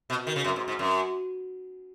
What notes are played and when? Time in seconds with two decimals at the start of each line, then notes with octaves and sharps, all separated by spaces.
0.10 B2
0.27 D#3
0.36 C#3
0.44 F#2
0.56 G#2
0.68 G#2
0.79 F#2